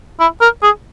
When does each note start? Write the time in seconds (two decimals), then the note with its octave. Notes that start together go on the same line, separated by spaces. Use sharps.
0.20 E4
0.41 A#4
0.63 G#4